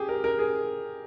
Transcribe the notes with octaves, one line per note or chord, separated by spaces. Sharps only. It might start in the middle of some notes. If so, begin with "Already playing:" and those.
Already playing: G4 G#4
A#4
A#4
G#4